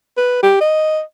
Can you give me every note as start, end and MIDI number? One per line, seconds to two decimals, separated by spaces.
0.17 0.43 71
0.43 0.58 67
0.61 1.01 75